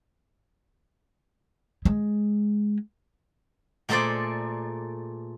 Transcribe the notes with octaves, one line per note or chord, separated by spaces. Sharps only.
G#3
A#2 A3 G#4 A4 C5 D5